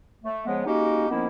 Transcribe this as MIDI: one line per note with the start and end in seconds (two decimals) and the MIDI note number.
0.24 0.43 57
0.46 0.66 49
0.46 0.66 53
0.46 0.66 56
0.46 0.66 59
0.66 1.06 56
0.66 1.06 58
0.66 1.06 61
0.66 1.06 63
0.66 1.06 66
0.66 1.06 67
1.09 1.27 51
1.09 1.27 53
1.09 1.27 58
1.09 1.27 59
1.09 1.27 61
1.09 1.27 64